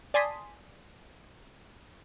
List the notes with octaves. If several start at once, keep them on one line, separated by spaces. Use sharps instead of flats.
D5 G#5 A5 C6 D#6 B6